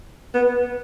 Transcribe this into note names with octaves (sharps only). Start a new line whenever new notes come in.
B3